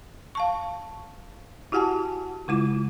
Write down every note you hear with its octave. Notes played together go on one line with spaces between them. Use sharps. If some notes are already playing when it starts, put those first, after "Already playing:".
F5 A5 C#6
E4 F#4 G4 F#5 G#5 A5
C#3 G#3 E4 F4